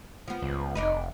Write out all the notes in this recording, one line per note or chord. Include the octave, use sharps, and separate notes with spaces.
F3 B3
C#2
F1 D4 D#4 B4